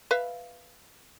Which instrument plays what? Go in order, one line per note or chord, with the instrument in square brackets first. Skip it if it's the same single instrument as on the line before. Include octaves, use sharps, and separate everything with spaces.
[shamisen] B4 E5 F5